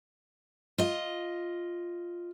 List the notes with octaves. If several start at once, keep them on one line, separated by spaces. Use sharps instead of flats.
F4 D#5